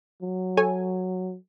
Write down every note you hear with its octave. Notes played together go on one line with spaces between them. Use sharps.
F#3
A4 C#5 G#5